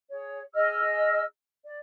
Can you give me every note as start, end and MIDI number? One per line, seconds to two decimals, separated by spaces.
0.09 0.41 68
0.09 0.41 73
0.54 1.22 68
0.54 1.22 75
0.54 1.22 88
0.54 1.22 89
1.64 1.77 74